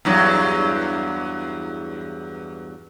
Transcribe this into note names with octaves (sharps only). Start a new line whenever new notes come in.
E2 G2 F#3